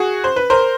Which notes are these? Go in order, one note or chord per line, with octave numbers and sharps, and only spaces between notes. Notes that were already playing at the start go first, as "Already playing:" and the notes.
Already playing: F#4 G#4
C5
B4
A#4 C5